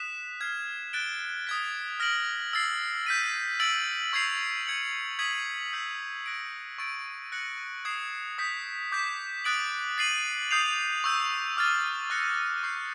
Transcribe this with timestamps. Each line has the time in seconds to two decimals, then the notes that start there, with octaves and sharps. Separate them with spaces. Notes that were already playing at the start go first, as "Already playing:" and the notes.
Already playing: D#6 F#6 B6 E7
0.41 F6 G#6 C7
0.93 F#6 A6 D7 G7
1.47 D#6 G#6 B6
2.00 F6 A#6 D7 F#7
2.53 E6 A6 C7
3.06 G6 B6 D#7
3.60 E6 A6 D7 F#7
4.13 C#6 E6 G#6 C7 F7
4.66 G#6 C#7 F#7
5.19 D#6 G#6 B6 D#7 F#7
5.73 E6 G6 B6
6.26 F#6 A#6 D7
6.78 C#6 E6 A6 D7
7.32 F#6 A#6 C#7 F#7
7.85 D#6 G#6 C7 E7
8.38 D#6 G6 B6
8.92 D6 G6 B6
9.44 D#6 F#6 A6 D7 F#7
9.98 A6 C7 D#7 F#7
10.51 D#6 G6 C7 F7
11.04 C#6 E6 G6
11.57 D6 F6 A6
12.10 C#6 F#6 A#6 C#7
12.63 C#6 E6 G6 C7